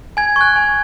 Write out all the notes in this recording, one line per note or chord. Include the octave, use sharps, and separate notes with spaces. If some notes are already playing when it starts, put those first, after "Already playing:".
G#5 G#6
C#6 F#6
G#5